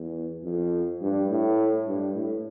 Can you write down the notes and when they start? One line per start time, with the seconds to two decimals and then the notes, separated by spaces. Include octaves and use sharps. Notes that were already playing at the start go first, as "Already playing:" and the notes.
Already playing: E2
0.44 F2
1.01 G2
1.29 A2
1.87 G2
2.15 A2